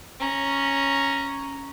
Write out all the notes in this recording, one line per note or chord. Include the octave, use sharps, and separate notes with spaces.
C#4 A#5